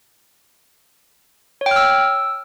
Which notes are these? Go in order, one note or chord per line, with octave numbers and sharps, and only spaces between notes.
C#5
G5
F6
E6